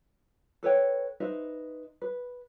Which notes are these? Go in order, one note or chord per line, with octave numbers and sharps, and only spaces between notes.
A4 B4 C#5 G5
D#4 B4 C5 E5
B4